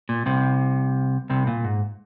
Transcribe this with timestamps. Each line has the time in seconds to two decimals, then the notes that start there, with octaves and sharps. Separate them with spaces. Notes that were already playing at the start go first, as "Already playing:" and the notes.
0.09 A#2
0.26 C2 C3
1.30 C2 C3
1.47 A#2
1.64 G#2